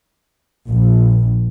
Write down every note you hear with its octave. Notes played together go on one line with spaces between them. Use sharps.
A#1